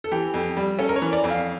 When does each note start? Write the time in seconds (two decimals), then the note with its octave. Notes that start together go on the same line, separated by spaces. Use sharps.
0.04 A4
0.12 E3 G4
0.34 F2
0.57 G3
0.79 C#4 A4
0.89 A#4
0.96 C#5
1.02 E3
1.13 D5
1.24 F2
1.30 F5